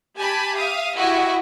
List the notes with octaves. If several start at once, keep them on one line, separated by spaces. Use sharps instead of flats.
G4 G#5 A5 B5
E5 F5 D#6
E4 F#4 G4 D#5 E5